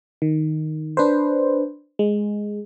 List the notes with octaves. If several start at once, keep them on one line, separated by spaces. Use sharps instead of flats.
D#3
D4 B4 C5
G#3